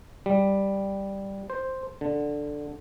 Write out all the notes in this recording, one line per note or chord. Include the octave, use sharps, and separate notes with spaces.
G3
C5
D3